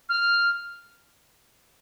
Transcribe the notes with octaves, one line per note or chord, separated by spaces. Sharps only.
F6